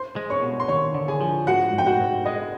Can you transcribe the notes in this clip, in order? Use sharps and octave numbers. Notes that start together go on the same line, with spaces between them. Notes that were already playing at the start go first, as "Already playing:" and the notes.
Already playing: C5 C6
G#3
C#5 C#6
B2
C6
D#2 C#5 C#6
D3
G#4 G#5
F3
G#2 F#4 F#5
G#2
G5
F#4 F#5
G#2
G#3 D#5